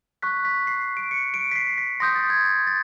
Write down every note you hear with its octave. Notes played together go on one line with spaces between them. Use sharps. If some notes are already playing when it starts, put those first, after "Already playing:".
C#6 F#6 B6
B6
C7
D7
C#7
D7
B6
C7
B6
C6 D#6 G6 A#6
A6
G#6
G#6
A6